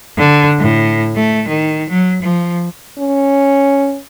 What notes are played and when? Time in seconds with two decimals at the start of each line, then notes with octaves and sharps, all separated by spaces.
0.18 D3
0.59 A2
1.16 A3
1.48 D#3
1.90 F#3
2.22 F3
2.99 C#4